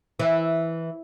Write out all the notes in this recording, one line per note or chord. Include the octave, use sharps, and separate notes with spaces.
E3